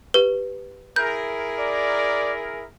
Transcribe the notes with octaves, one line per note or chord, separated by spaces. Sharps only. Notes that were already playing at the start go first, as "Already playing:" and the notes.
G4 B4
E4 G#4 A#4 G6
D5